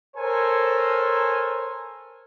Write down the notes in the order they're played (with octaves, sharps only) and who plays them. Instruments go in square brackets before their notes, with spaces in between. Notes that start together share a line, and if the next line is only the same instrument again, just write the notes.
[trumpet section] A4 A#4 C5 C#5 G#5